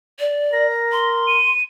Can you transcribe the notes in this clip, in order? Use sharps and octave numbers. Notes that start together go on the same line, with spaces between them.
D5
A#4 A#6
C6
D#7